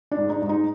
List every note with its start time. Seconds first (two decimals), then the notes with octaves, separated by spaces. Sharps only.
0.11 D4
0.17 G#2
0.30 D#4
0.42 G#2
0.49 D#4